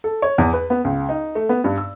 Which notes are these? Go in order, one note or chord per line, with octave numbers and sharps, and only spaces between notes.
A4
C#5
E2
B4
B3
C#2
D#4
A3
B3
G2
E6